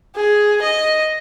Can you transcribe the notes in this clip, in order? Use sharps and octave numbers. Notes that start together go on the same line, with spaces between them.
G#4
D#5